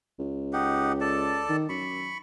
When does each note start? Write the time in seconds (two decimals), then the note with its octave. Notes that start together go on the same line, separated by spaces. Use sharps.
0.19 C#2
0.53 D#4 G4 F#5
1.01 A4 D5 A5
1.49 D#3
1.69 F#2 B5 C#6